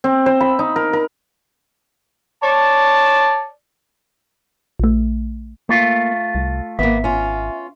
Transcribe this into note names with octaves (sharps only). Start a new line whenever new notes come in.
C4
C5
B5
D#4
A#4
A#4
C#5 D5 A5
A#1 A3
A3 A#3 F4
C2
G#1 A#3 B3 E5
C#4 F4